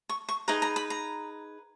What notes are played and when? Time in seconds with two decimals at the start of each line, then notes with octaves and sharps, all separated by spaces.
0.09 C#6
0.29 C#6
0.48 D#4 G#4 B4 A#5
0.62 A#5
0.76 B5
0.90 A#5